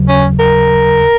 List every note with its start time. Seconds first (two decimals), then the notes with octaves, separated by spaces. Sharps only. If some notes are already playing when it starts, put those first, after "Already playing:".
Already playing: D#2 C#3 F#3
0.08 C#4
0.39 A#4